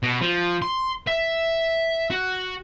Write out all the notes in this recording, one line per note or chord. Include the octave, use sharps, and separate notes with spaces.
B2
F3
C6
E5
F#4